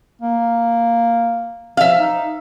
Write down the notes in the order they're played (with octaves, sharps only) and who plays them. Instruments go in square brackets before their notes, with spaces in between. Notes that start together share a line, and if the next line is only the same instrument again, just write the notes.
[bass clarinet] A#3
[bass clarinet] F3 [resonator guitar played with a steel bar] E5 F5
[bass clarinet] D#4